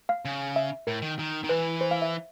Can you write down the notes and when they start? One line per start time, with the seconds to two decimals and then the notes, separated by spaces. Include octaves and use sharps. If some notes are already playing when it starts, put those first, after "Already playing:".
0.09 F5
0.25 C#3
0.56 E5
0.87 A2 A#4
1.02 D#3
1.19 D#3
1.44 D#3
1.49 E3 B4
1.81 C5
1.91 F5
2.02 E5